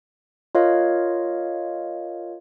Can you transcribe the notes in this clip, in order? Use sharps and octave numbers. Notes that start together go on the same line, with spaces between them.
F4 A#4 C#5 D#5 F5